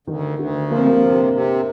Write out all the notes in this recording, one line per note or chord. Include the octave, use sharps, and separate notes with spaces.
D2 D#3
D2 D3
F3 A#3
C4
A#3
C3
C3